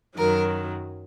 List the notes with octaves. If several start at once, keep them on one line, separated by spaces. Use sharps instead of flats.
F#2 D#3 F#3 A#4